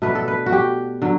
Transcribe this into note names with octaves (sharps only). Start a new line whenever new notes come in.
B2 A3 D4 B4
A4
B4
F#4
G4
D3 F#3